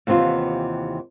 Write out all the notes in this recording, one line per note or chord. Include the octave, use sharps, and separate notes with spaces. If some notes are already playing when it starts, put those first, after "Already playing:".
D#2 C3 E3 B3 F4